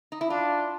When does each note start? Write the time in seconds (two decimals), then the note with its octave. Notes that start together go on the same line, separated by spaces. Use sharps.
0.12 D#4
0.21 E4
0.30 D4 F4